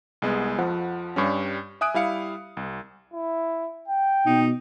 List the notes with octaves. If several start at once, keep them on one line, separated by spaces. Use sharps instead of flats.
C2 G#3 B3
F2 F3 F#5
G2 G3 C#4
E5 G#5 D#6 F#6 D7
G3 E4 F5 C#7
C2
E4
G5
B2 D#4